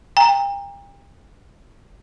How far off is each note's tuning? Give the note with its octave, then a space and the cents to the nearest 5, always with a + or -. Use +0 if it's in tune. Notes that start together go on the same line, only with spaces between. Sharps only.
G5 +35 A#5 +0